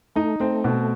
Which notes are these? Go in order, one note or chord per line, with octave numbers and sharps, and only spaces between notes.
A3 D#4
A3 C4
B2